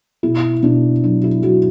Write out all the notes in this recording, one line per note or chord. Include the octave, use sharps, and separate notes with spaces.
B2 E4
B2 D4
F#3 D4
E4
F#3 F#4